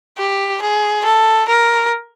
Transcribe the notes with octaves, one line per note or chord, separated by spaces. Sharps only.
G4
G#4
A4
A#4